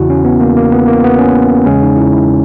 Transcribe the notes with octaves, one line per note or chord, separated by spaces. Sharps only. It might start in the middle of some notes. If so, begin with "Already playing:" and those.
Already playing: E2 C#3 E3 E4 F#4
C#4
B3
A#3
A#3
B3
A#3
B3
C#4
E2 C#3 G#3 C#4
D#4
E4
E4